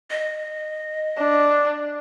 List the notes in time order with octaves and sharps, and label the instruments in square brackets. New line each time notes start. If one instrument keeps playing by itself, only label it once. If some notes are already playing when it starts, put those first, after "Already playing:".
[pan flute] D#5
[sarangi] D4